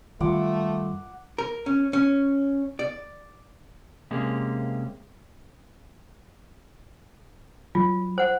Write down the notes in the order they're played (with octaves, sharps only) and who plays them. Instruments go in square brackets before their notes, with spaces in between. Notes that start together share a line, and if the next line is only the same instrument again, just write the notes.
[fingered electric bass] F#2 D#3 G3 [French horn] A3 [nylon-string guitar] F4 [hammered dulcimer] F#5 D6
[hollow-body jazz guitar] A#4
C#4
C#4
D5
[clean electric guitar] C3 G#3 A#3 C#4
[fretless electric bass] F#3 [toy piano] F4
[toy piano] C5 F#5